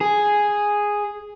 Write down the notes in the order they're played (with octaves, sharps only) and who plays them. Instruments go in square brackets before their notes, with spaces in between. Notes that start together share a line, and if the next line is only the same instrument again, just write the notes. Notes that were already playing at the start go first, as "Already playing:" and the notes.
[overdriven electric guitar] G#4